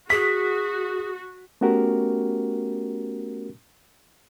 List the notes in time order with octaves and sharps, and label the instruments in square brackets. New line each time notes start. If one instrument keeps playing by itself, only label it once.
[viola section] F#4 [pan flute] G#4 [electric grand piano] B6
[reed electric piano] A3 B3 C#4 F#4 G4 A#4